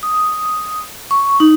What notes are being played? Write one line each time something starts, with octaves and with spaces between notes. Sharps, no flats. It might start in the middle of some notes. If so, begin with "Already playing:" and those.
D#6
C#6
D#4